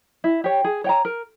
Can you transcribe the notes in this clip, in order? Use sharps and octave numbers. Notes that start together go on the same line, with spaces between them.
E4
G4 C#5
G#4
C#5 G5 A#5
A#4